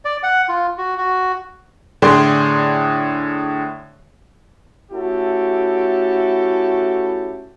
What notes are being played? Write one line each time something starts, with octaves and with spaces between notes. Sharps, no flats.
D5
F#5
F4
F#4
F#4
A2 D3 G#4 D5 G5 C6
A3 C#4 E4 F#4 G4 A4